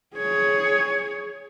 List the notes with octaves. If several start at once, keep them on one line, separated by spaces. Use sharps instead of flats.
G#4 C#5